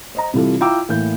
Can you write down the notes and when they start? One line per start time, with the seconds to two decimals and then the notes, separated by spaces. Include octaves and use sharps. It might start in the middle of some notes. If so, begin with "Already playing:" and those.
0.15 C5 D#5 A#5
0.33 C3 E3 G3 E4 F4 A4
0.60 E4 F4 G5 A#5 D6 E6
0.88 A2 E3 A#3 G6